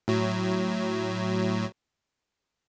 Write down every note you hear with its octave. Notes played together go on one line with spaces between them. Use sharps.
A2 F#3